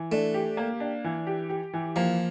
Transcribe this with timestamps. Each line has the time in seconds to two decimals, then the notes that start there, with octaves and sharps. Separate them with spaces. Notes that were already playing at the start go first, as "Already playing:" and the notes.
Already playing: E3
0.12 A3 D4
0.34 G4
0.57 A#3
0.80 D4
1.04 E3
1.27 G4
1.49 G4
1.73 E3
1.96 F3 A#3